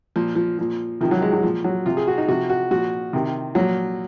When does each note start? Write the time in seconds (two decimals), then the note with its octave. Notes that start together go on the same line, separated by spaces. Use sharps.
0.16 A#2 F3
0.35 F3
0.58 A#2 F3
1.00 C3 D#3 F3
1.11 F#3
1.22 G#3
1.33 F#3
1.43 A#2 F3
1.64 F#3
1.86 C3 F3 F4
1.97 G#4
2.08 F#4
2.18 D#4
2.28 C3 F3 F#4
2.50 F#4
2.71 A#2 F3 F#4
3.13 C3 D#3
3.55 A#2 F3 F#3